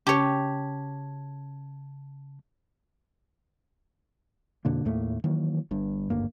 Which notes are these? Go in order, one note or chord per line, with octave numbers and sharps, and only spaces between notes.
C#3 C#4 G4 C#5 A5 G#6
F2 B2 D3 A#3
D#2 A2 A3 A#3
D#3 E3 F#3 A#3
G1 G2
G#1 D2 G2 A#3